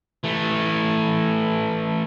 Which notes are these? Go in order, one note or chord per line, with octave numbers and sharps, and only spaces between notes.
E3 A3